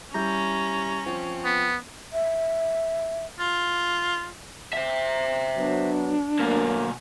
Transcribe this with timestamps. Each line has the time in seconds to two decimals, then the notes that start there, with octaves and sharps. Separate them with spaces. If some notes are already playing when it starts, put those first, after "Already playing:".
0.14 G3 C#4 E4 A#5 G6
1.06 F3 C4
1.45 B3
2.13 E5
3.39 F4
4.73 C5 E5
5.56 F#3 B3 D4
6.40 D2 B2 F#3 A#3 A#4